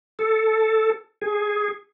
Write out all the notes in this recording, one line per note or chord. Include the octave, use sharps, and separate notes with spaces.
A4
G#4